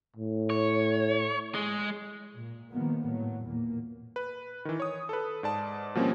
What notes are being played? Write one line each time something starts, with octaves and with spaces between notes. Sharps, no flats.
A2
C#5
G#3
A#2
D#3 F3 G3 A#3 B3
A2 F#3
E2 A#2 A#3
B4
D#3 E3
C#5 D#6
A4 B4
G#2 D5 A5
B2 F3 G3 A#3 C4 C#4